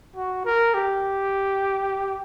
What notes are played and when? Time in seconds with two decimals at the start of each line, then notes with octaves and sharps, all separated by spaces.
0.16 F#4
0.45 A#4
0.74 G4